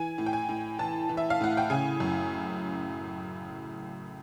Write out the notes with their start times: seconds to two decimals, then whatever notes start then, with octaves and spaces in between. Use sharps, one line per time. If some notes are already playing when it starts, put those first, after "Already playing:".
Already playing: E3 G#5
0.18 A2
0.26 G5
0.33 G#5
0.49 A2
0.79 E3 A5
1.09 E3
1.17 E5
1.30 F5
1.41 A2 F#5
1.57 G5
1.70 C#3 G#5
2.00 F#2